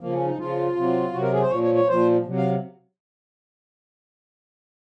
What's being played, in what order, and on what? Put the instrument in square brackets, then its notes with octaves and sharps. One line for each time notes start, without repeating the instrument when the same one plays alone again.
[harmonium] C#3 F3 A#3
C#4
D#4
C#3 F3 F4
C3 F#3
C3 F#3 F#4
A#4
G#4
C5
A#2 F3 C#5
C#5
C#5
A#2 F3 C5
C3 F#3
F5